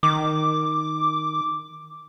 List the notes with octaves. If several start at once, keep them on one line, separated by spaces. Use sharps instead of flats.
D#3 D6